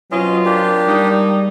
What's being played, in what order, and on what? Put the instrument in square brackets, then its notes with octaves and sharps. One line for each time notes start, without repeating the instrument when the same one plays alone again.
[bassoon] B2 [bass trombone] F#3 [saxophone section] C4 F4 [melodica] C#4 D#5
[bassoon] A#3 [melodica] D4 G4
[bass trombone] G3 [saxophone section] G#3 D#4